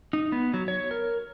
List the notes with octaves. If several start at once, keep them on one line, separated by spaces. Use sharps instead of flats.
D#4
B3
F#3
C#5
A#4